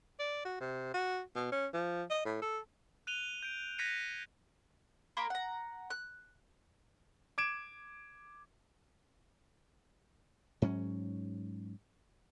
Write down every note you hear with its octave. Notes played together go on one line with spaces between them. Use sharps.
D5
F#4
C3
F#4
B2
C#4
F3
D#5
A2
A4
F#6 D#7 F7 G7
G6 D7
F#6 G#6 A#6 B6 C#7 D#7
A#3 A#4 B5 C6
F#5 A#5
F#6
D6 G#6 D7 E7
G#2 F#3 C#4